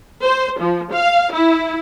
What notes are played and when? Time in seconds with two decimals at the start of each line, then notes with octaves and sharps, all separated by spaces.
0.23 C5
0.60 F3
0.92 F5
1.33 E4